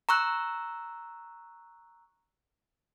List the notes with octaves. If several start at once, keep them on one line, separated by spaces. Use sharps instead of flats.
A#5 C#6 E6 F#6